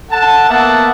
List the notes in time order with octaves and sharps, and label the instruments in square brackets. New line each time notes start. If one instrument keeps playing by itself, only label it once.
[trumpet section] A4 F#5 A5
A#3 B3 E5 F#5 A5